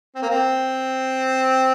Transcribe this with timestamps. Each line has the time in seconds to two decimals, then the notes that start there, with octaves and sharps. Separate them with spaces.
0.15 C4
0.22 A#3
0.29 C4